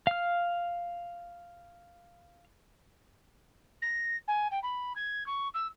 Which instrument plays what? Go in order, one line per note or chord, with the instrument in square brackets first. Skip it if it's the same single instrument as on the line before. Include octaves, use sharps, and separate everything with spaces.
[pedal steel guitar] F5 F6
[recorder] A#6
G#5
G5
B5
G#6
C#6
E6